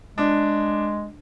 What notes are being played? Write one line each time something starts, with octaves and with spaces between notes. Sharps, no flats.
G#3 D4